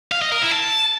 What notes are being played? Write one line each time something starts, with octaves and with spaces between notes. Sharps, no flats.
F5
D#5
A#4
E4
A5